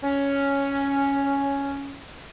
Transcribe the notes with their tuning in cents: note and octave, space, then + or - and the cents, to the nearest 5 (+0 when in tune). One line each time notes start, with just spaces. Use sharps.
C#4 +5